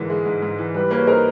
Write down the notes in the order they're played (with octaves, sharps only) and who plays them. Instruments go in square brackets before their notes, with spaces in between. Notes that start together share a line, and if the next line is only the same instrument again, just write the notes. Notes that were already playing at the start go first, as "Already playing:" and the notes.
Already playing: [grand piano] G#2 D3 E3 [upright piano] A#4
[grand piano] G#3
G#2
G#2
E3
[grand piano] G3 [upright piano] B4
[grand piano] A#3 [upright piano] B4 C#5
[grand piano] D#4 [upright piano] A#4 C5